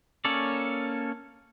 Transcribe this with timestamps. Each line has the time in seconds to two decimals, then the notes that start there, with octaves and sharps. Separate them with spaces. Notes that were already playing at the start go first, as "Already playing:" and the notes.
0.25 A#3 C#4 A4 C#5 D5